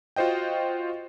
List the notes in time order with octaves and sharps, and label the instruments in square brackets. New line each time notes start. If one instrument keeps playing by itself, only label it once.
[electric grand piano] F4 F#4 C5 D#5 G5